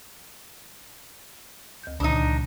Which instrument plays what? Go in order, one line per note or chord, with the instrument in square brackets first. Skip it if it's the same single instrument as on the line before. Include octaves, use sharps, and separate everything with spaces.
[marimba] D2 G6
[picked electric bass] C#2 [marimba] A#2 D3 D#3 [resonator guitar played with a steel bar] D4 D#4